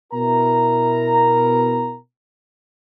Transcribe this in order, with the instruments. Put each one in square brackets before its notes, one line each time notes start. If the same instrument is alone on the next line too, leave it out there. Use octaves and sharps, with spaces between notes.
[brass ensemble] B2 E4 A#4 A#5